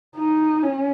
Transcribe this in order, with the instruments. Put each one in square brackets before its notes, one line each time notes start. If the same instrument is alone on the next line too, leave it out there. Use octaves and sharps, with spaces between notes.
[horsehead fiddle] D#4
C#4